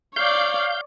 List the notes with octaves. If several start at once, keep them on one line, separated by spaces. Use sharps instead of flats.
C#5 D5 F5 G6